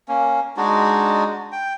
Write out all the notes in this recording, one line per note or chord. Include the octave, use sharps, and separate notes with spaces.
A#3 C#4
G#3 D4 D#4 F#4
G5